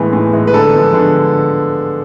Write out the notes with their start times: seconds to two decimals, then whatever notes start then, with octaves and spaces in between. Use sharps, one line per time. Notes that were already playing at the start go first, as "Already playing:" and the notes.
Already playing: A2 E3 G#3 B3
0.13 A2
0.33 E3 G#3 B3
0.47 B4
0.53 D3 A4
0.74 F3 G#3 B3
0.94 D3